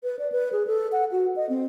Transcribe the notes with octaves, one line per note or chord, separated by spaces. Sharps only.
B4
D5
B4
G#4
A4
F#5
F#4
D#5
C4